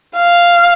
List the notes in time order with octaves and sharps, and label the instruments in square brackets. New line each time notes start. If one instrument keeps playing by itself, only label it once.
[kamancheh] F5